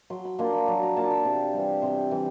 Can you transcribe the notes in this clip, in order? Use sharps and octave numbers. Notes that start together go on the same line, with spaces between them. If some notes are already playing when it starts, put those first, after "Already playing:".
F#3 C6
B5
A#3 D4 F4 C6
B5
F#3 A#5
A#5
A#3 D4 F4 A5
B5
C3
E3 G3
C3 C6
E3 G3